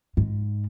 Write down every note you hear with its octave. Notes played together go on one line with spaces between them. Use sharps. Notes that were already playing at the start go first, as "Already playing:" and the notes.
G#2